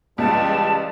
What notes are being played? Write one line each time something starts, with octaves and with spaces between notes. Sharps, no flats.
C#2 E3 G3 A5